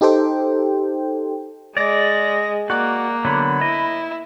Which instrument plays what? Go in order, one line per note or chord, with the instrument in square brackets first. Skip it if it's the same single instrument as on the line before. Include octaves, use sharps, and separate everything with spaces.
[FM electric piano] D#4 G4 A4 C5 G5
[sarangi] G#3 [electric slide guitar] D5 [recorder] A#6
[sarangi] A#3 [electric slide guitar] F#4 [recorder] D5
[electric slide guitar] D3 F#3 B3 [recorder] B5
[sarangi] E4 [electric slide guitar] D#5